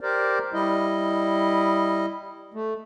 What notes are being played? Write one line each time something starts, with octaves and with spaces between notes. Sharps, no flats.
G4 A#4 C5 D5
G3 E4 D#5
A3